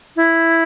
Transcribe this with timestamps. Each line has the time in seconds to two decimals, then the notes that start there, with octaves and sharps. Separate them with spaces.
0.16 E4